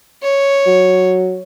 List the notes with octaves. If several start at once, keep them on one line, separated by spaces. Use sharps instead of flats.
C#5
F#3